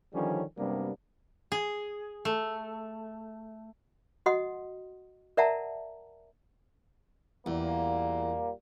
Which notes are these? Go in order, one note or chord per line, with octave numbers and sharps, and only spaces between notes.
D3 D#3 F3 G3 C#4
F#2 C3 G3 A#3 B3 D4
G#4
A3
F#4 D#5 F#5 C6 D#6
A#4 D5 E5 F#5 A5 A#5
E2 A#2 G3 A#3